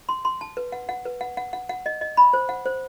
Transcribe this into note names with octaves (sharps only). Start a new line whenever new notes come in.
C6
C6
A5
B4
F#5
F#5
B4
F#5
F#5
F#5
F#5
D#5
D#5
B5
C5
F#5
C5